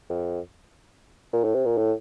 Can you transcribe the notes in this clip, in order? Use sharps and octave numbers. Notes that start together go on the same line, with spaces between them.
F2
A#2
A2
C3
A#2
A2